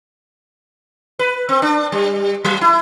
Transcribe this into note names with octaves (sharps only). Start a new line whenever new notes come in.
B4
C4
D4
G3
F#3
E4